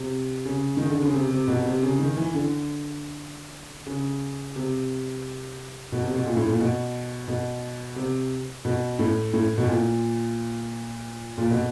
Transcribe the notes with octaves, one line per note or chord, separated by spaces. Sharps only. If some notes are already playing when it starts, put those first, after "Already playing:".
Already playing: C3
C#3
D#3
D3
C#3
C3
C3
B2
C3
C#3
D#3
E3
D3
C#3
C3
B2
C3
B2
A#2
A2
A#2
B2
B2
C3
B2
A2
A2
B2
A#2
A#2
B2